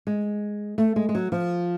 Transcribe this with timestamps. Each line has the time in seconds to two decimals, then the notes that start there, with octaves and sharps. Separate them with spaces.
0.07 G#3
0.78 A3
0.96 G#3
1.09 G#3
1.15 F#3
1.32 F3